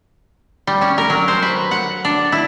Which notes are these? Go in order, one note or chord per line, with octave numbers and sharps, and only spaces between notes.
G3
C#4
A#4
F#3
C5
B4
F#5
D4
E4